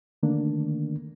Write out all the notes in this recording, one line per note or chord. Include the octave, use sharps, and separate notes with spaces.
D3 D#3 A3 A#3 D4